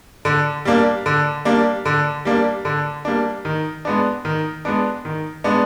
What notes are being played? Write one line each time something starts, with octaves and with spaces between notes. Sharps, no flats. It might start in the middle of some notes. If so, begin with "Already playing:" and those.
D3
G3 A#3 D4
D3
G3 A#3 D4
D3
G3 A#3 D4
D3
G3 A#3 D4
D#3
G#3 B3 D4
D#3
G#3 B3 D4
D#3
G#3 B3 D4